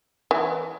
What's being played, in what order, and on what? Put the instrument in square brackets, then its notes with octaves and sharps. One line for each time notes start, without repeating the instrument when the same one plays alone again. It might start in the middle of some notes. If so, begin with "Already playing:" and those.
[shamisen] E3